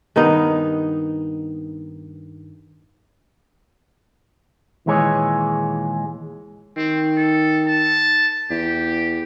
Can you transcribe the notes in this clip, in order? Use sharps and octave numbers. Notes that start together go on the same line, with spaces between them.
G2 D#3 B3 D#4
D#2 A#2 E3 G#3 G#4 C#5
D#3 C4
A4
A5
E2 G4